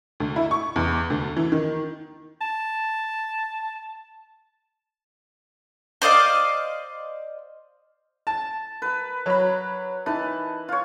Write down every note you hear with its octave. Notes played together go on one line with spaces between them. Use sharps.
D2
E4
C#6
E2
D2
E3
D#3
A5
C5 D5 D#5 F5
A5
B4 A#5
F#3 B5
E3 D#4 B4 A5
F4 C#5